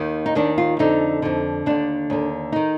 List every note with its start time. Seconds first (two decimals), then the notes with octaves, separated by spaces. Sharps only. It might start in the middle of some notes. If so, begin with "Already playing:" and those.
Already playing: D#2 D#3
0.26 D#4
0.35 D#2 D#3 D4
0.58 F4
0.79 F2 D3 D#4
1.22 F2 D3
1.66 D#2 D3 D4
2.10 D#2 D3
2.52 D#3 D#4